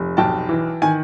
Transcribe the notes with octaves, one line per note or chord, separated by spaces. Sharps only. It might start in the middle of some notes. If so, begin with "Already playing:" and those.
Already playing: F1
B1 G5 A5
E3
D#3 G#5